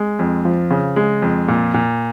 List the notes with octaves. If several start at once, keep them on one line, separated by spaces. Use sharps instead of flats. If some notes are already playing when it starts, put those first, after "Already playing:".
Already playing: G#3
F2
F3
C#3
G#3
F2
A#2
A#2